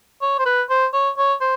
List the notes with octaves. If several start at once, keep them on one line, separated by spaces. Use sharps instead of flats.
C#5
C5
B4
C5
C#5
C#5
C5